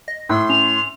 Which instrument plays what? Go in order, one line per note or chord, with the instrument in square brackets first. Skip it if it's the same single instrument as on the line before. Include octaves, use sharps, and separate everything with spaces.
[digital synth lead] D#5
[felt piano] A2 [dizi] C6 [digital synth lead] E6
[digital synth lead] C#4 [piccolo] F7